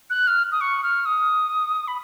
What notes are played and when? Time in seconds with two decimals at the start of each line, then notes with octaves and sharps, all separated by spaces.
0.10 F#6
0.27 F6
0.52 D#6
0.61 C#6
0.83 F6
1.06 D#6
1.88 B5